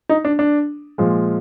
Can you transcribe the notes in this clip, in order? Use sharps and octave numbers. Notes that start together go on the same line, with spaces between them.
D#4
D4
D4
A#2 F3 G#3